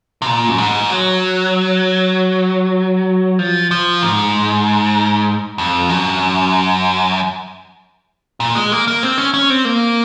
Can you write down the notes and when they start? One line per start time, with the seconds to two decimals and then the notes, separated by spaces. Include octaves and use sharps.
0.22 C3
0.27 A#2
0.49 F#2
0.58 G#2
0.89 F#3
3.39 F3
3.71 F3
4.03 G#2
5.58 F2
5.89 F#2
8.40 A#2
8.55 G#3
8.72 A#3
8.88 A#3
9.03 C4
9.18 C#4
9.34 C#4
9.50 C4
9.65 A#3